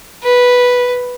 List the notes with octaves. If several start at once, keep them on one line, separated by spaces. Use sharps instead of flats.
B4